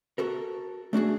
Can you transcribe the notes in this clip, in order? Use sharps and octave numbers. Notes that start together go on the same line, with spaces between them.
F#4 A4 A#4
A3 D4 F#4 G#4